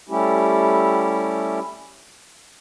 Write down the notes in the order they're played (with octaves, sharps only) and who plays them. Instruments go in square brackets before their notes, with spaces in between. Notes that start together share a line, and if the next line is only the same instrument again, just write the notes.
[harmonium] G3 A3 C#4 E4 G4